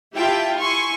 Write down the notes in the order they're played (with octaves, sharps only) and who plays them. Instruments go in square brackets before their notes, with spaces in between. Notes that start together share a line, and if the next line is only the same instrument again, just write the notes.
[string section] E4 F4 G4 E5 G5 A5
E4 G#5 C6 C#6